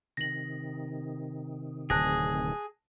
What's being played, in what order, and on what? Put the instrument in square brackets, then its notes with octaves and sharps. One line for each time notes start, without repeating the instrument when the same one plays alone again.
[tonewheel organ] C3 D#3 [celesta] A#6 F#7
[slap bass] D1 [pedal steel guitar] G#4 [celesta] A5 F#6 A#6